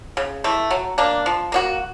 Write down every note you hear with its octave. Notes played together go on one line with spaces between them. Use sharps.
C#3
E3 A3
F#3
A#3 D4
F3
A#3 D4 F#4